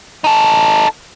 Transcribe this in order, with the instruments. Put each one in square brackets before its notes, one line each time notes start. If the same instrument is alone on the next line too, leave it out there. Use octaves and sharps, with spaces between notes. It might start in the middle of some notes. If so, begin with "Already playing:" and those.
[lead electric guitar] D#4 A4